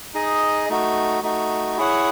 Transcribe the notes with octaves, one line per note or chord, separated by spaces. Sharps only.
D#4 G#4 D#5
A3 D#4 F#4
A3 D#4 F#4
E4 G#4 C#5 F#5